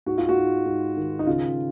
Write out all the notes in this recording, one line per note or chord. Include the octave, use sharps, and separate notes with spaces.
G#2 F#4
F4
F#4
G#2
G#2
D#3
D#4
C#3 F4